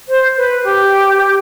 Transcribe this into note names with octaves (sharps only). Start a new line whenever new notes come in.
C5
B4
G4